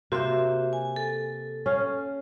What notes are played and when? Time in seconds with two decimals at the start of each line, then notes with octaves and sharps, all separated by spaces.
0.12 C3 A#3 F#4 C5 E5
0.73 G#5
0.96 A4
1.66 C#4 F5